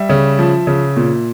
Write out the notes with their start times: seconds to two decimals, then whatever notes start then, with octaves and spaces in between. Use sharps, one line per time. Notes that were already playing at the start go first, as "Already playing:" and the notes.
Already playing: G3 E5
0.09 C#3
0.39 F3
0.67 C#3
0.97 A#2